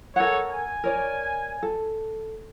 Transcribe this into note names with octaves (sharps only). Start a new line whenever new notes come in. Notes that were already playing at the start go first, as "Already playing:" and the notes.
A4 A#4 C#5 F#5 G#5
G#5
A#4 C#5 D5
A4